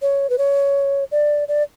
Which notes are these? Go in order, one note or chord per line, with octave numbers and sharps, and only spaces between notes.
C#5
B4
C#5
D5
D5